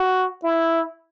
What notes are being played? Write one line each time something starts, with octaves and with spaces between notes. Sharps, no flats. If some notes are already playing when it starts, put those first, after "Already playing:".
Already playing: F#4
E4